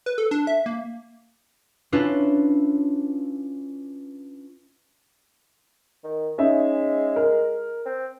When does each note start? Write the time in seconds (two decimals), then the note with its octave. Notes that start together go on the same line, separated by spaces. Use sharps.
0.06 B4
0.18 A4
0.31 D4
0.47 E5
0.66 A#3
1.92 C#4 D4 E4 F4 B4
6.04 D#3
6.38 G#3 C#4 D#4 E5
7.16 A#4
7.85 C4